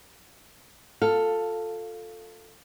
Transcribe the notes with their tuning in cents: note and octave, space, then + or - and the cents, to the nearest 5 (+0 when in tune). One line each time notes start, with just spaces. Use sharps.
F4 +20 A4 +10 F5 +0